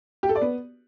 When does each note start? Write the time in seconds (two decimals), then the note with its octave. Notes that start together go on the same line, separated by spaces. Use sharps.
0.23 G4
0.29 A4
0.35 D5
0.42 B3